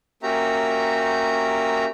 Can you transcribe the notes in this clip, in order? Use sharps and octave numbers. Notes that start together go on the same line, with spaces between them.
A#3 C#4 F#4 G4 E5 A#5